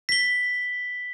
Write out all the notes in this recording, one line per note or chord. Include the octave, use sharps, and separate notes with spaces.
B6 G7